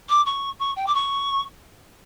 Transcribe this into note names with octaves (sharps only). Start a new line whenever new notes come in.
D6
C#6
C#6
G5
D6
C#6